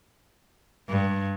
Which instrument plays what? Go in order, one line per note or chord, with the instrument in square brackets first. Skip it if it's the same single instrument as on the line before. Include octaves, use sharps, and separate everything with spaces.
[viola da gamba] G2